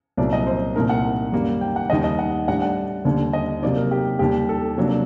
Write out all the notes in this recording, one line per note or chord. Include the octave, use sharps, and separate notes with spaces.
C2 A#2 F#3 D5
D#5
C5
C2 A#2 A3 D#4 A#4
F#5
F#2 D#3 G3 A#3
G5
F#5
D#2 D#3 G3 D#5
D#5
F#5
A2 G3 D4 F#5
F#5
D#2 D3 G3
D#5
C3 F#3 A#3 D#4 D5
A#4
G4
D#2 D#3 G3 G4
A4
C3 F#3 A#3 D4